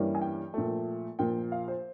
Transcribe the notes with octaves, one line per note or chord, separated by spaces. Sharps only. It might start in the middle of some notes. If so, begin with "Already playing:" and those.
Already playing: G2 E3 G3 A#3 C#4
G#5
G5
A#2 F3 A3
A#2 F3 A#3 G5
F5
C5